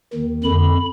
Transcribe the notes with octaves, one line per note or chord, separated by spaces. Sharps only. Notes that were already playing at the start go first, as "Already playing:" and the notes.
D#2 D#3
F2 D3 B5